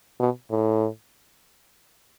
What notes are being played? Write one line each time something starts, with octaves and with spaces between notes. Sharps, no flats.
B2
A2